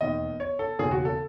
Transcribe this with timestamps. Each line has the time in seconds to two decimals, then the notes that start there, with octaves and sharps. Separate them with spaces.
0.01 E1 D#2 D#3 D#5
0.40 C#5
0.59 A4
0.79 E1 D#2 C#3 G#4
0.91 F#4
1.05 A4